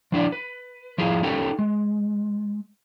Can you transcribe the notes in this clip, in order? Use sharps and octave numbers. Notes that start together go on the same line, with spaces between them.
F3 D4 E4 D5
B4
F3 E4 F4 G#4
C#4 D#4 G4 A4
G#3